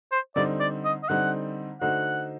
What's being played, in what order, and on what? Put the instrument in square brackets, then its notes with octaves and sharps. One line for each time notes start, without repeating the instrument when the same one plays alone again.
[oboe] C5
[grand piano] D3 G3 C4 D#4 [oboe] D5
[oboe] D5
D#5
D#5
[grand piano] D3 G3 C4 D#4 [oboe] F#5
[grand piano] D3 A3 D#4 F#4 C5 [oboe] F#5